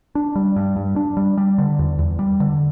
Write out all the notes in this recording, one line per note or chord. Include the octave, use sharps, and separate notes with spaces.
D4
G3
G2
G2
D4
G3
G3
D3
E2
E2
G3
D3